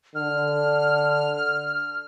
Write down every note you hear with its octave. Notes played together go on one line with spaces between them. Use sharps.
D3 F6